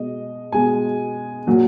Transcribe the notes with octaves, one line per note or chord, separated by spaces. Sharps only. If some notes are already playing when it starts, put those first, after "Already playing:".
Already playing: B2 G#3 D#5
B2 G#3 G#5
A#2 F#3